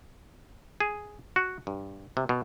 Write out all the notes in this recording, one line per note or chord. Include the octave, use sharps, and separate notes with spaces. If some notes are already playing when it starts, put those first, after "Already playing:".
G#4
F#4
G2
C3
B2